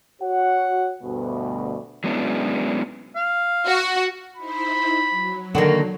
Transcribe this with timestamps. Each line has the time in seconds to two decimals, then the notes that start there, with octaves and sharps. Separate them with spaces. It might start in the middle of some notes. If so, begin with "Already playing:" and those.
0.22 F#4 C#5 F#5
1.02 D2 G2 B2
2.04 F#3 G#3 B3 C#4 D4 E4
3.15 F5
3.65 F#4 F#5
4.37 D#4 E4 C5 B5
5.09 F#3
5.55 D3 D#3 A#3 D4 F#4